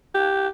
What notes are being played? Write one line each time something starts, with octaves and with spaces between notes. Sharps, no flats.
G4